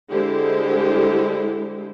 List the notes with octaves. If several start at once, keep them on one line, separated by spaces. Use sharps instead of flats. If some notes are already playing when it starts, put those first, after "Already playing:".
D3 G#3 E4 G4 C5